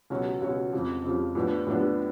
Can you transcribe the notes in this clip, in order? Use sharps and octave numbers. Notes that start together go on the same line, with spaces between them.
C#2 B2 F#3 C#4 F#4
C#2 B2 F#3 C#4 F#4
F2 C#3 F3
F2 C#3 F3
A2 F3 B3 D4
A2 F3 B3 D4